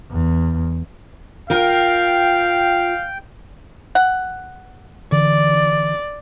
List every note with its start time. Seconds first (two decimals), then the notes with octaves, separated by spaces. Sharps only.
0.11 E2
1.50 F4 A#4 F5 G5
3.95 F#5
5.12 D3 E3 D5